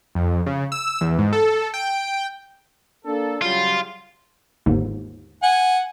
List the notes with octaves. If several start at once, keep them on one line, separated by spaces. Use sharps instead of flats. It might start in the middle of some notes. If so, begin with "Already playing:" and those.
F2
C#3
E6
E2
G#2
A4
G5
A#3 D4 A4
C#3 F#3 G3 F4
G1 D#2 G#2
F#5 G#5